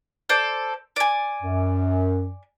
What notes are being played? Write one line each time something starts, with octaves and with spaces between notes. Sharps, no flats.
A4 C5 D5
D5 G#5
F#2